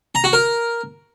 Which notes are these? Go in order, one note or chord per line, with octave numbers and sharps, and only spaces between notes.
A#5
F#4
A#4